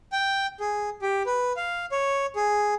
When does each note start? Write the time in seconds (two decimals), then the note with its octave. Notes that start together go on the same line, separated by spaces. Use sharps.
0.12 G5
0.60 G#4
1.02 G4
1.26 B4
1.56 F5
1.92 C#5
2.36 G#4